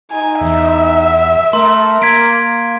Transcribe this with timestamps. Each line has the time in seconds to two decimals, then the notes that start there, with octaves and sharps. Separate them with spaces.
0.11 D#4 G#5
0.41 E2 E5
1.53 A3 A#4 C6
2.02 A#3 G#6 B6 D7